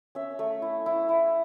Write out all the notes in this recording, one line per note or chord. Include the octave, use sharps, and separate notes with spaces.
C#4 E5
A3
E4
E4
E4